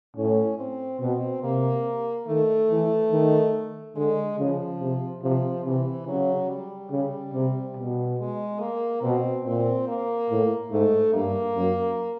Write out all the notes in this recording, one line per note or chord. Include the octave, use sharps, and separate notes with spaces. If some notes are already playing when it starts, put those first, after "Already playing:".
A2 C#4
C4
B2 C4
C3 A#3
D#3 A3
E3
D#3
D3 G#3
C#3 F3
C3
C3 F3
C3 E3
C#3 F#3
G3
C#3
C3
B2
G#3
A#3
B2 C4
A#2 C4
A#3
A2
G#2 A3
G2 A#3
F#2